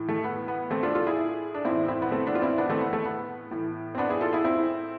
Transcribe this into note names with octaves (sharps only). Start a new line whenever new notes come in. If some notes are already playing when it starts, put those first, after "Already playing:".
Already playing: A2 E3
A3
B3
B3
A3 C4
D4 F4
F4 A4
E4 G#4
D4
A2 E3 C4 E4
C4 E4
B3
A3 C4
B3 D4
F4
C4 E4
B3 D4
A3 C4
B3
A3
B3
A2 E3
C4
B3 D4
E4 G#4
F4 A4
E4 G#4
C4 E4